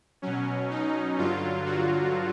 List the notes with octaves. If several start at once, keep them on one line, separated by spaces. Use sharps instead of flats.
B2 F#3 C#4
D#4
G2 D3 F#3 F4
F#4